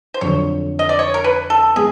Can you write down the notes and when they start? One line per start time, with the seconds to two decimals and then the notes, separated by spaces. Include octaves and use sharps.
0.14 C5
0.21 F2 D3 F#3 C#5
0.79 D#5
0.89 D5
0.99 C#5
1.14 A#4
1.24 B4
1.50 A4
1.76 G#3 B3 G#4